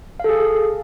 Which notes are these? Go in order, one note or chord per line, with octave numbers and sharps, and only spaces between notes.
G#4 A4 F5